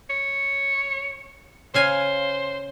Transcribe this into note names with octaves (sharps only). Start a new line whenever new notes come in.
C#5
C#3 C5 F5 G#5